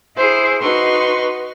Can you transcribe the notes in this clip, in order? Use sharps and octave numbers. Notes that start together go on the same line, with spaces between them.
E4 G#4 C5
D#4 F#4 B4 C6 C#6